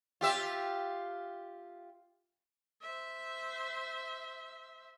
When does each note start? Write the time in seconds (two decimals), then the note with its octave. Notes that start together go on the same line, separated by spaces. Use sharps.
0.21 F4 G4 E5
2.82 C5 E5